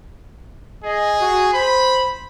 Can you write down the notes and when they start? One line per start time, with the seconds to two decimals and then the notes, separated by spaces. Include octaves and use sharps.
0.84 G#4 D#5
1.21 F#4
1.54 C5 B5